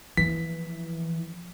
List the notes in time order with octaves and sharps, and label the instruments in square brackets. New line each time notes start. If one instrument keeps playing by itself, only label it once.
[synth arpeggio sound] E3 [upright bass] F3 A#3 [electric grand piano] B6